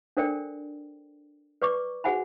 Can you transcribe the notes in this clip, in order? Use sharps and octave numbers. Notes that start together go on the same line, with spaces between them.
D4 A4 A#4 C5 D5 G5
B4 D5 C#6 D6
F#4 G#4 C5 F#5 G#5 B5